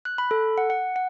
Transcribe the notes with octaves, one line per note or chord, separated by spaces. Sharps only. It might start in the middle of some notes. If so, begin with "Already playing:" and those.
F#6
B5
A4
F#5
F#5
F#5